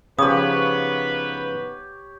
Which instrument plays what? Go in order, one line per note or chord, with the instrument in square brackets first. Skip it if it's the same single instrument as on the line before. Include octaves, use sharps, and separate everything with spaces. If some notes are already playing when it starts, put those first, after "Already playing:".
[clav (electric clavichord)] C#3 F3 [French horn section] B3 D#4 B4 [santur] G4 C#5 [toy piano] D#6